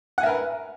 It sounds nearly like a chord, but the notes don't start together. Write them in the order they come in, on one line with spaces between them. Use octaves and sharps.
F#5 G#5 E5 A#4 B4